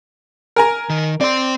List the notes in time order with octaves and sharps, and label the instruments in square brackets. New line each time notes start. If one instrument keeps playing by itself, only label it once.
[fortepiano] A#4 G#5 A#5
[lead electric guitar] D#3
[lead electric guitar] C4 C5 [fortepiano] D5